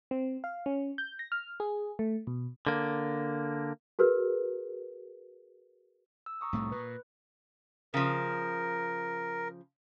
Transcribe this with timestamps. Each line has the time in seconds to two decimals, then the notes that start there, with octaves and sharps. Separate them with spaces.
0.11 C4
0.44 F5
0.66 C#4
0.98 G6
1.19 A#6
1.32 F6
1.60 G#4
1.99 A3
2.27 B2
2.67 D3 A#3
3.99 F#4 G#4 A#4 B4
6.26 E6
6.41 A#5 C#6 D#6
6.53 C2 A2 A3
6.72 A#2 B4
7.94 C#3 F3 A#4